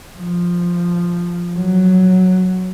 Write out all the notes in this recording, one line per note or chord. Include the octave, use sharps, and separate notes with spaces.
F3
F#3